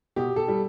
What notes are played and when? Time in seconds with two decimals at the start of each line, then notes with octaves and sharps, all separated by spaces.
0.16 B2 G4
0.36 A4
0.48 G3